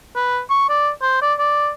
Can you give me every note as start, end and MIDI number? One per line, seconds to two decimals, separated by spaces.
0.16 0.39 71
0.50 0.69 85
0.69 0.90 74
1.02 1.17 72
1.21 1.34 74
1.39 1.70 74